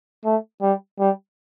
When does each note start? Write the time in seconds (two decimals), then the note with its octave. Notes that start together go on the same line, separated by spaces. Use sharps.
0.25 A3
0.62 G3
0.99 G3